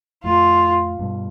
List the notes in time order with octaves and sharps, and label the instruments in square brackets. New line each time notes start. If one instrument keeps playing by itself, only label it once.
[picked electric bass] F2 A2 [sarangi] F4
[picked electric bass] G2 B2